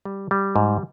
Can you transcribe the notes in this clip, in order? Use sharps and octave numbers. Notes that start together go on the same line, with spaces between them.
G3
G3
G#2